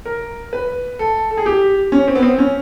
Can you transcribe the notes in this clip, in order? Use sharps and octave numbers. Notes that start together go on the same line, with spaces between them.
A#4
B4
A4
A4
G#4
G4
C#4
C4
B3
C4
C#4